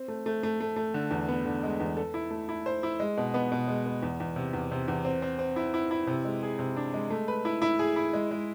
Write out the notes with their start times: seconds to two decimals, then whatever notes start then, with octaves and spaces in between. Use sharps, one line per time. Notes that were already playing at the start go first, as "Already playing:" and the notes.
Already playing: C4
0.08 A3
0.26 A3
0.43 A3
0.60 A3
0.76 A3
0.94 D3
1.11 E2
1.28 B3
1.46 D3
1.63 G#3
1.80 E2
1.97 A4
2.14 E4
2.31 A3
2.49 E4
2.66 C5
2.83 E4
3.00 G#3
3.17 B2
3.34 B3
3.52 B2
3.68 G#3
3.86 B3
4.02 E2
4.20 E2
4.36 C3
4.53 E2
4.71 C3
4.88 E2
5.05 C4
5.22 C4
5.39 C4
5.56 E4
5.74 E4
5.91 E4
6.07 C3
6.25 G#3
6.43 G#4
6.59 C3
6.76 D4
6.94 G#3
7.10 A3
7.28 B4
7.45 E4
7.62 E4
7.79 G#4
7.96 E4
8.13 G#3
8.31 G#3